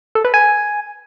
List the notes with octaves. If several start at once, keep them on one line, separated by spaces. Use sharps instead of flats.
A4
B4
G#5